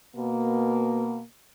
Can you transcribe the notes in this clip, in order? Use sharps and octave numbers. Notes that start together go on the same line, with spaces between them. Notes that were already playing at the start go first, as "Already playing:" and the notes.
B2 A#3